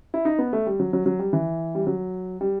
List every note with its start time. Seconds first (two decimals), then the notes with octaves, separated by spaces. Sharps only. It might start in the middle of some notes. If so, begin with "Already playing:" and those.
0.14 E4
0.25 D#4
0.39 B3
0.53 A3
0.67 G3
0.80 F#3
0.93 F#3
1.06 F#3
1.19 G3
1.33 E3
1.75 G3
1.87 F#3
2.41 G3